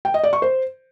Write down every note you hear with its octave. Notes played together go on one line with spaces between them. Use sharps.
G5
D#5
D5
C#6
C5